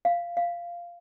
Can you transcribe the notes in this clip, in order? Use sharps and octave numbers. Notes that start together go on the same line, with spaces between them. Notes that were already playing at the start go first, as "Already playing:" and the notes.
F5
F5